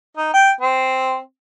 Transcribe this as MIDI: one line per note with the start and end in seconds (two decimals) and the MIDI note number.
0.17 0.32 63
0.34 0.50 79
0.61 1.19 60